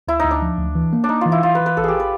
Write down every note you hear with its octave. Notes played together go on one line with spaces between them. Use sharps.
D2 E4
D2 D#4
D4
F3
D2
E3
A#3
D4
A#3 D#4
E3 F4
E4
E3 F4
B4
E3
B4
A1 A4
G4 G#4
B4